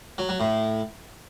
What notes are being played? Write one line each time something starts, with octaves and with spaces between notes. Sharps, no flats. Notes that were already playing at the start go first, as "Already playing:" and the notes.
F#3
F#3
A2